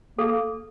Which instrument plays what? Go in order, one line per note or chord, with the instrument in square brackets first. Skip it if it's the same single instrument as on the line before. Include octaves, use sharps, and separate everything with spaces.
[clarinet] A#3 [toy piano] A4